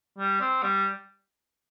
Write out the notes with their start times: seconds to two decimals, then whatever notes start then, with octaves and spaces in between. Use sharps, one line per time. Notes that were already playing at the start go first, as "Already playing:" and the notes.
0.18 G3
0.40 C4
0.63 G3